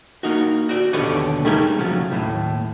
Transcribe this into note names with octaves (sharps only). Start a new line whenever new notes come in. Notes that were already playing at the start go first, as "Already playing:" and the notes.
A#3 D#4 F#4
F#4 D5
D#2 B2 D3 G4 C#5 D#5
G3 A3 D#4 G#4 A#4
C3 F3 F#3 C#4
D#2 A2